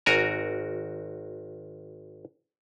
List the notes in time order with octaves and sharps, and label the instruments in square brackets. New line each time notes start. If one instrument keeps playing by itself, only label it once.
[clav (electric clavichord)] G#1 F#4 A#4 G#5 A#5